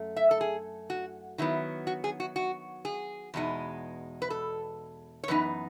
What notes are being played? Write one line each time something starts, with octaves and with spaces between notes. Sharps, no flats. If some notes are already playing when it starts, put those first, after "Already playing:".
Already playing: F#2 A3
E5
A4
G#4
F#4
D#3 F#3 B3 E4
F#4
G#4
F#4
F#4
G#4
E2 B2 G#3 D#4
B4
A4
C#5
F#2 E3 B3 D#4 B4